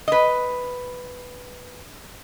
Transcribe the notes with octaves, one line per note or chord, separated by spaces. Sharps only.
B4 D#5